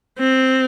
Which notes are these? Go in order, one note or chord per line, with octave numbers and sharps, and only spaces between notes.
C4